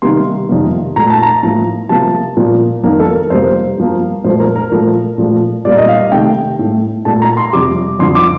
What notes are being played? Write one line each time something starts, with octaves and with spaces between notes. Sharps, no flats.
C3 D#3 G3 A#3 C6
F2 C3 D#3 A#3
A#2 A3 A#5
A5
A#5
A2 F3 A#3
C3 F3 A#3 A5
A#2 F3 A#3
F2 D#3 A#3 A#4
A4
A#4
F2 C3 G3 A#3 C5
G2 F3 A#3
A#2 F3 A3 C5
A#4
A#4
A#2 F3 A3
A#2 F3 A3
A#2 G3 A#3 D5
D#5
F5
C3 D#3 A3 G5
A2 A3
A#2 A3 A5
A#5
C6
F2 C3 G3 D6
F2 D3 F3 C6
D6